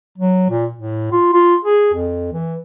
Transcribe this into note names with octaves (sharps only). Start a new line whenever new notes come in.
F#3
A#2
A2
F4
F4
G#4
F2
E3